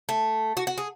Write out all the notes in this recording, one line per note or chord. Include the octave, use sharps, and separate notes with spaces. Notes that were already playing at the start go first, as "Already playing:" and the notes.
A3
F#4
F#4
G#4